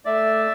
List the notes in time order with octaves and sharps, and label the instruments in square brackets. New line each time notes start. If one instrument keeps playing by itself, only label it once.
[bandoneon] A3 D5 E5